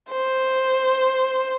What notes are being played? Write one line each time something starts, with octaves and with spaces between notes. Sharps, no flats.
C5